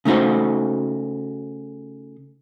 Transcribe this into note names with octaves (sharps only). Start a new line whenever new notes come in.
C#3 A3 D#4 F#4 C5